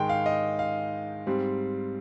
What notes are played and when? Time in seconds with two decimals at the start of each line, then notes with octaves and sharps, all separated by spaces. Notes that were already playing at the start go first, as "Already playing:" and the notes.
Already playing: G#2 D#3 G#3 G5
0.09 F5
0.26 D#5
0.59 F5
1.27 G#2 G3 C4